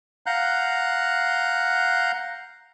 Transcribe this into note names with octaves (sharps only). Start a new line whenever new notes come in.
F5 F#5 A#5 F#6 G6